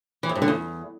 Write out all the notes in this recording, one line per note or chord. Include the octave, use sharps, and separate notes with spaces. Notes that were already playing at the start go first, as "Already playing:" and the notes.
E3
F2
G2
D3
E2